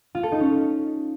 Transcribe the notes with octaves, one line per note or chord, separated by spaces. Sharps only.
F4
A4
D#4
C#4